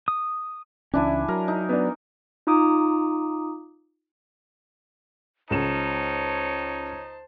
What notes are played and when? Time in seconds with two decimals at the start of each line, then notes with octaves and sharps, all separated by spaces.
0.08 D#6
0.94 C#2 E3 C#4 D4 E4 G#5
1.28 F#3 A#4
1.48 D#4
1.69 B3 D4
2.47 D#4 F4 A#5 D6 D#6
5.50 C#2 D#4 C5 C#5 A5 E7